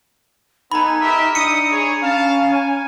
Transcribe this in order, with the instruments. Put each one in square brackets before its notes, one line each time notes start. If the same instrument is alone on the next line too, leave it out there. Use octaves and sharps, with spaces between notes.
[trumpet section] B3 A4 G#5 [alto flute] D#4 [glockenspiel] A#5 B5
[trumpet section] G4 A#4 E5
[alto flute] D4 [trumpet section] E4 D#5 D#6 [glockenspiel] C#7 D#7
[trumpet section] G#4 C#5
[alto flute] C#4 [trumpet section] F5 A5
[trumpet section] G#5